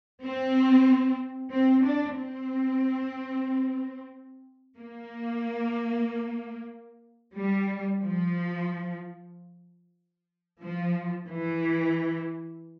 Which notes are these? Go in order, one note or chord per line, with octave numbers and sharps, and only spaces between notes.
C4
C4
D4
C4
A#3
G3
F3
F3
E3